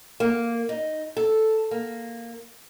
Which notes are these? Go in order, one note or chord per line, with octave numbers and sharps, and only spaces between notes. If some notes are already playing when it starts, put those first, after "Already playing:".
A#3
D#4
A4
A#3